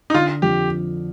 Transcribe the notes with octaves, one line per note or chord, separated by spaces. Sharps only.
D#4
D3 F4
F2 G4